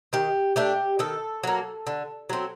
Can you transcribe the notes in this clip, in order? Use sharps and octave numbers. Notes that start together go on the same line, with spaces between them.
D#3 G4
A3 D4 G4
D#3 A4
F#3 A#3
D3
F#3 C4